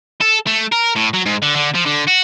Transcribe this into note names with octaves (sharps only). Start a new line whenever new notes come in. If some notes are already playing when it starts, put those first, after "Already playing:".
A4
A3
A#4
A2
F#3
G#2
D3
D3
F3
D3
F#4